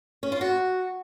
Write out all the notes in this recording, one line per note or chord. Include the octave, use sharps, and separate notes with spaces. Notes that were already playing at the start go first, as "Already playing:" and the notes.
C#4
F4
F#4